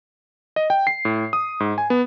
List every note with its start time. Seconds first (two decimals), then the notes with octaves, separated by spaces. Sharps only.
0.56 D#5
0.70 G5
0.87 C7
1.05 A2
1.33 D#6
1.60 G#2
1.78 G#5
1.90 B3